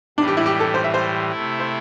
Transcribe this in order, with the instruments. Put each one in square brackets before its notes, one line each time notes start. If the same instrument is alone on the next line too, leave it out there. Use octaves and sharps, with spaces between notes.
[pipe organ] A2 E3 G3 [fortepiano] D4
[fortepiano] G4
E4
G4
A4
C5
E5
C5
[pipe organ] C3 A3 E4
[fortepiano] C5